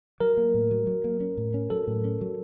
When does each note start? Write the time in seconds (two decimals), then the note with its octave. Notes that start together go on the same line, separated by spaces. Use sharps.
0.20 F#3 A#4
0.37 A#3
0.54 A2
0.71 F#3
0.87 F#3
1.04 A#3
1.20 C#4
1.37 A2
1.54 C#4
1.70 F#3 A4
1.87 A2
2.04 C#4
2.21 F#3